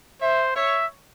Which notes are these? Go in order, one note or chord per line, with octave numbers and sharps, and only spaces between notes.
C5 E5
C#5 E5